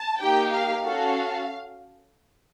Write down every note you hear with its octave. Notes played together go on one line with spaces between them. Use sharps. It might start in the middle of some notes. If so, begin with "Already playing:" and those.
Already playing: A5
A#3 D#4 G4 G5
F5
C#4 F#4 A4 F5